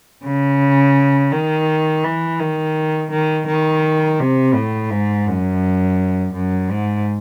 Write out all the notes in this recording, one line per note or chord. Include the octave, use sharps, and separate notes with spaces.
C#3
D#3
E3
D#3
D#3
D#3
C3
A2
G#2
F#2
F#2
G#2